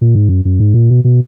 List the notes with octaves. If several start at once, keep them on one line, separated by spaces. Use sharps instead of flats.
A#2
G#2
F#2
F#2
G#2
A#2
B2
B2